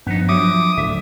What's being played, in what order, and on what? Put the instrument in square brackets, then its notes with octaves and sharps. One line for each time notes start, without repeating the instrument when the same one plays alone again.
[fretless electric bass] G2 F3 [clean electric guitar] B3 D#4
[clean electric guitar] F3 E5 [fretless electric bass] F#3 D4 [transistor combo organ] D6 D#6
[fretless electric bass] D2 A2 D3 [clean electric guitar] E5